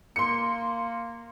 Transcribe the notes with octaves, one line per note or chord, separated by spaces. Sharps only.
A#3 C6 C#7